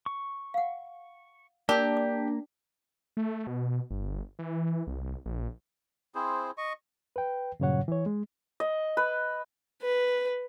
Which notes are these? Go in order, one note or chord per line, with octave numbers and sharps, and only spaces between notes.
C#6
F5 F#5
A#3 D4 G4 A#4 A#5
D6
A3
B2
G1
E3
C2
A#1
C4 E4 G#4 C5
D#5 C#6
B4 G5
G2 A#2 C#3 F#3 C#5 F#5
E3 C#5
G#3
D#5
B4
B4